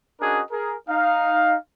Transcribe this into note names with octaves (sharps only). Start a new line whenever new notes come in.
C#4 D4 F#4 G#4 A#4 D#5
G#4 A#4
D#4 F5